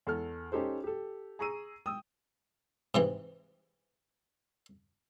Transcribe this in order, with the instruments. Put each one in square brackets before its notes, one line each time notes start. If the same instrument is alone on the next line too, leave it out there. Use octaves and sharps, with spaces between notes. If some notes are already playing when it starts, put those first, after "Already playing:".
[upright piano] E2 A4 F6
C#4 D#4 G4 A4 C5
G4 A4
G#4 A#5 C#6 E6 D#7
G5 D#6 E6
[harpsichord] G#2 C3 E3